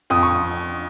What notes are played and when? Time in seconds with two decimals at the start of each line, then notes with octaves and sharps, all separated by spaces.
0.10 F2 D#6
0.23 C#6